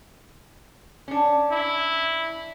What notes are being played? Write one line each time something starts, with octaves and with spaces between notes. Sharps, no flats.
C#4 D4
E4